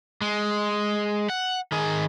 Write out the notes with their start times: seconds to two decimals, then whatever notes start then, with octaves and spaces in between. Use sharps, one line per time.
0.21 G#3
1.30 F#5
1.72 D#3 G#4